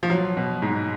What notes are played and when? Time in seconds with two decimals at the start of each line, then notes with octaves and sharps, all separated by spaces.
0.03 F3
0.10 F#3
0.37 B2
0.62 G#2